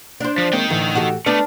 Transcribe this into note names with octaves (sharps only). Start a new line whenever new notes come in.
D4 C5
F3
G#3 A#3 C4 D#4 G5
A2 D3 E3 A3
F#4 G4 A4
A3 B3 D4 D5 F6